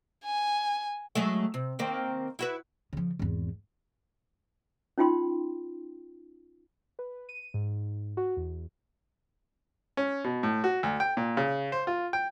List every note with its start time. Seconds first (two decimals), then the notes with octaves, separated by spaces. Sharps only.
0.25 G#5
1.15 F#3 G#3 A3
1.54 C3
1.79 D#3 A#3 C4
2.39 E4 F#4 B4
2.93 C#3 F3
3.19 G#1 E2
4.98 C#4 D#4 F4 G5 C6
6.99 B4
7.29 D#7
7.54 G#2
8.17 F#4
8.37 E2
9.97 C#4
10.24 B2
10.43 A2
10.64 F#4
10.83 D2
11.00 G5
11.17 A#2
11.37 C#3
11.72 C5
11.87 F4
12.13 G5